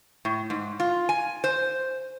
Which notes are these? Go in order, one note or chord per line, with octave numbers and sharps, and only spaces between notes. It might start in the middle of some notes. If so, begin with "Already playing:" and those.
A2
G#2
F4
G#5
C5